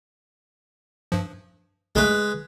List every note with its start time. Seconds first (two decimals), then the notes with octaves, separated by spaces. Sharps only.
1.12 G2 F3
1.96 B1 C#3 G#3 A3 B4